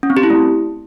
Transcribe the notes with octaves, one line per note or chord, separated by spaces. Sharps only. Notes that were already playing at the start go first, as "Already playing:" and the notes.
C#4
C4
G4
E4
A3